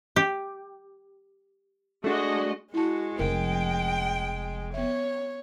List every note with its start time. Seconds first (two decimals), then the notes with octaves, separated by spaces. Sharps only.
0.16 G4
2.04 G#3 A3 D4 F#4 D#5
2.74 G#3 E4 F#4 A5
3.19 F1 F3 A#4 G5
4.74 B3 C#5 E5